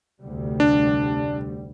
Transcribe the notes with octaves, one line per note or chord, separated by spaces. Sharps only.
F1 D2 G3
D4